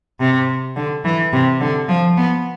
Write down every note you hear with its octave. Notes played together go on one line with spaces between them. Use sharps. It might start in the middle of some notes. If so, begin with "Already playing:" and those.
C3
D3
E3
C3
D3
F3
B3